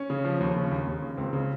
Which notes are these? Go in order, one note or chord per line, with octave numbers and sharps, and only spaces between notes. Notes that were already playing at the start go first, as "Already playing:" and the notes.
Already playing: C#4
C#3
F3
D#2
C#3
D#2
D#2
C#3
C#2 C4
C#3